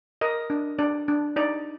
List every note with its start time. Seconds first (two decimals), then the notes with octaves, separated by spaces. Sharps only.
0.21 A#4 D#5
0.50 D4
0.79 D4 D5
1.08 D4
1.36 D#4 D5